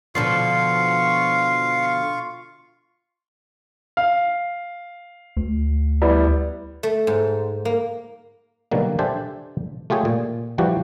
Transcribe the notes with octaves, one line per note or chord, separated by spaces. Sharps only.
B2 D3 F3 F4 F5 C#6 C7
F5
D2
G3 B3 E4
A3
G#2
A#3
B2 D3 D#3 F#3 G3 A#3
D4 G4 A4 C5 E5 G#5
A3 F4 G4 G#4 C#5
A#2
E3 F3 G3 F#4 G4